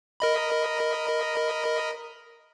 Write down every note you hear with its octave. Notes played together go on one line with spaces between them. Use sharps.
A#4 D#5 B5